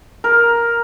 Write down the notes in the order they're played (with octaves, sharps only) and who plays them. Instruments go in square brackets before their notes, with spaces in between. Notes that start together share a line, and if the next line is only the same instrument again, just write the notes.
[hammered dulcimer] A#4